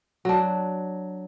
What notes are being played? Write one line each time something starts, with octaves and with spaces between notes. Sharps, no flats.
F#3 D4